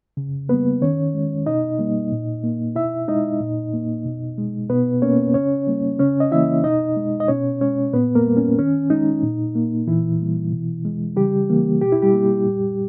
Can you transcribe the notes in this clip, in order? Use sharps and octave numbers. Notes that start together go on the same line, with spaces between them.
C#3
G3 A#3 B3 B4
D#3 C#4 C#5
G#3
B2 D#4 D#5
G3 A#3
A#2
A#3
B2 E4 E5
G#3 D#4 D#5
A#2
A#3
B2
G#3
B2 B3 B4
A#3 C#4 C#5
C#3 C#4 C#5
G3 A#3
C#3 C#4 C#5
D#5
E3 A#3 E4 E5
B2 D#4 D#5
G#3
D#5
B2 C#4 C#5
G#3 C#4 C#5
A#2 B3 B4
A#3 A#4
G3 A#3
C#4
D#3 C#4
G#3 D#4
A#2
A#3
A#2 E3 E4
G3 A#3
B2
G#3
C#3 G3 G4
E3 A#3
B2 G4
E4
G3 G4
A#3
A#2